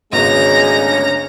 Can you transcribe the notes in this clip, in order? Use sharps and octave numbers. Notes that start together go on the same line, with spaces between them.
G#1 D2 C#3 G#3 B3 C#4 A#5